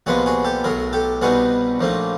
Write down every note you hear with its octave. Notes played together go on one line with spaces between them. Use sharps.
C2 A#2 F3 G#3 B3 F#4 G#4
F#4 G#4
G4 A4
B1 A2 F#3 G#4 A#4
G4 A4
C2 B2 G3 B3 D#4 F#4 G#4
A#1 A2 F3 A#3 D#4